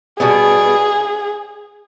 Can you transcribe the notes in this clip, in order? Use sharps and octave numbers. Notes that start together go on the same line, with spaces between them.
B2 G3 B3 G#4